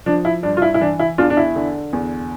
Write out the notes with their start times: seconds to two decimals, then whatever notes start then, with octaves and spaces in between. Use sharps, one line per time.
0.06 F3 D4
0.25 E4
0.43 G2 D4
0.57 F4
0.62 E4
0.74 E4
0.81 E3 D4
0.99 E4
1.18 E2 D4 F4
1.30 D4
1.37 E4
1.56 D3
1.93 E2